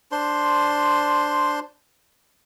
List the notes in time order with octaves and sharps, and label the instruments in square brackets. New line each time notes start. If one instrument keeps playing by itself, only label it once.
[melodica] D4 C5 C6